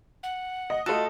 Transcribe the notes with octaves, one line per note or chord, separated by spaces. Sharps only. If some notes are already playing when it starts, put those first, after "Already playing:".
F#5
D#5
A3 F4 F#4 A4